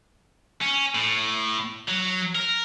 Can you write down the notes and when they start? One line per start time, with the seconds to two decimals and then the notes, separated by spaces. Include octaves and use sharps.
0.62 C#4
0.95 A2
1.88 F#3
2.35 A#4